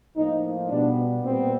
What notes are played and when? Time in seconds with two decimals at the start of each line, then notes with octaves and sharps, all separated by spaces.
0.16 A2 F3 A#3 D#4
0.69 B2 G3 B3 D4
1.23 A#2 G3 B3 C4